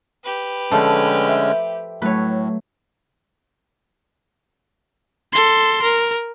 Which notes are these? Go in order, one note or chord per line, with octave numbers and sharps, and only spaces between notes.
G4 B4
D3 F3 G#3 A3 C#4
C5 E5 G5
A2 F#3 A3 B4 C#5
A4 C6
A#4